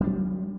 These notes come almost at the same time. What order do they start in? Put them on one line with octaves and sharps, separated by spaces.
G3 D4 F#3